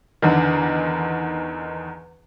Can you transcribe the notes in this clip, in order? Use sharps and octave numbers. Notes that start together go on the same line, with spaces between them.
E2 D3 D#3